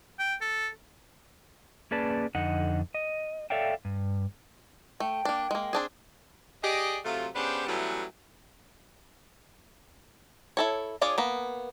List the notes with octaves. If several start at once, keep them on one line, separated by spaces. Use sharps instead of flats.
G5
A4
A#3 C#4 G#4 B4 D5 A5
F2 D3 D#4 D#5 F#5
D#5
A4 C#5 D5 E5 F5 G5
G2
A3 G5
A#3 D4
G#3 A#3
C4 D4 G#4
G4 G#4 D5 D#5
C3 F#3 A3 F4
C#3 B3 D4 G4 B4 C5
E3 F#3 G3 A3 B3 C#4
E4 A4 C#5
D4 F4 G#4 C#5 D5
A#3 B3